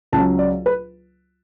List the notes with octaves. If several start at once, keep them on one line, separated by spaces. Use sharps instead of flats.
C#2 C#3 F#3 A5
D5
B4